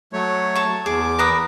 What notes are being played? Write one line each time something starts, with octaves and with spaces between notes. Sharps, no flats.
F#3 A3 C#5
A5 C#6
E2 G#4 D6
A#4 B4 D#6